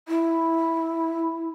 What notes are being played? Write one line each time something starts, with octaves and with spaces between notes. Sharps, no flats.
E4